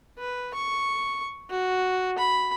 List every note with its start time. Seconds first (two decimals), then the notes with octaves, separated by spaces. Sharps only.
0.19 B4
0.54 C#6
1.50 F#4
2.18 B5